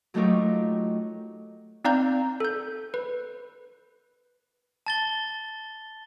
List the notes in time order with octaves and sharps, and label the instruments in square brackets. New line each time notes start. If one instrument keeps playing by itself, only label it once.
[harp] F#3 A3 D#4 F4 G4 A#4
[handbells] C4 D#4 D5 F5 A#5 G6
A4 G6
B4
[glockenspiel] A5 A6 G7